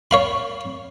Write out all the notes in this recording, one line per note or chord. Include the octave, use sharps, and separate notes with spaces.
C#5 F5 B5